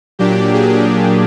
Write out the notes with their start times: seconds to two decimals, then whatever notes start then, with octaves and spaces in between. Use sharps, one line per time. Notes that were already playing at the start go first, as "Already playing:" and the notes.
0.19 A#2 F#3 A#3 D4 G4
0.54 G#4